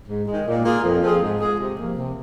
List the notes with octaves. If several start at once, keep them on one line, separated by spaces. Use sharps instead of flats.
G#2
D#3 G#3
A#2
A#3 F4 G#4
F2
F3 C4 F4 G#4
G#2
G#3 F4 G#4
C3
F3 A#3
C3